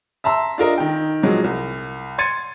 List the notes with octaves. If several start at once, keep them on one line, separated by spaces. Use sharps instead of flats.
E5 A5 A#5 C6 E6
D4 F4 A#4 D#5
D#3 G5
A#2 F3 F#3 G#3
C2
C6 G#6 A6 C#7 D#7